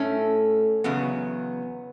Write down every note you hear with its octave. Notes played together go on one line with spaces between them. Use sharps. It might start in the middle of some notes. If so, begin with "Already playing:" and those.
Already playing: A2 A3 C#4
E2 C#3 F#3 B3